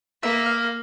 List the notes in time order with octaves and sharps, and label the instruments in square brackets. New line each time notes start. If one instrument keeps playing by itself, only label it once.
[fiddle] A#3 [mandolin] E5
[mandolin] F5